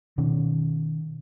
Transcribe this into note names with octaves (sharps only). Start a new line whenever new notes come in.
B2 D#3 C#4